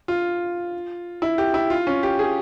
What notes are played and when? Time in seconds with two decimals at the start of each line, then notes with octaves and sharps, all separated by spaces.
0.08 F4
1.22 E4
1.38 G4
1.54 E4
1.70 F4
1.87 C#4
2.03 G4
2.19 G#4